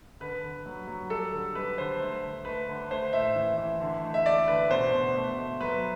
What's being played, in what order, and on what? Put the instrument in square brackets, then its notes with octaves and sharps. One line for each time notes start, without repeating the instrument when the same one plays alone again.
[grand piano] D3 B4
D3
F#3
F#3
G3 A4
D3
G3 B4
D3 C5
A3
D3
A3 B4
D3
A3 C5
A2 E5
E3
E3
D3
A3
E5
A3 D5
D3 B4
B2 C5
B2
A3
A3
F#3 B4